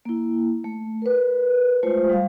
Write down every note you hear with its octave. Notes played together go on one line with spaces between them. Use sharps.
A#3 E4
A3
A#4 B4
G#3 A3 F4 C5
G3 F5